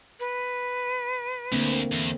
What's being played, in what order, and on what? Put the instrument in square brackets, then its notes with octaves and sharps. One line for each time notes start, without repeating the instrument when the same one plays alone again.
[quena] B4
[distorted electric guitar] D2 [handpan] D3 A#3 C4
[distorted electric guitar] E2